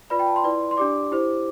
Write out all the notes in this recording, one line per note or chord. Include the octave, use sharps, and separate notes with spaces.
F4 B4 D5 B5
G5
A5
C6
E4 B4 D5
C6
D4 G4 D5 D6
E4 G4 C5